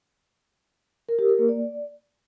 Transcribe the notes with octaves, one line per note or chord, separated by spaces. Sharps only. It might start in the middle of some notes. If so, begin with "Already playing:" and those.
A#4
G4
A#4
A#3
D5